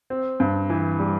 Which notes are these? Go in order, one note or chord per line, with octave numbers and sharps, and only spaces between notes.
C4
G2
E3
G3